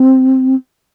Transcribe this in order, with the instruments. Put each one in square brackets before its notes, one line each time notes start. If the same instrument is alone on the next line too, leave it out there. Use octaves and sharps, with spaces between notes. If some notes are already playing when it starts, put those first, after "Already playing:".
Already playing: [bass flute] C4